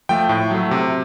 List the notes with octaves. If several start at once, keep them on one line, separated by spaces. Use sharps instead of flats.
F3 A3 G5
A2
F#3 A3
C3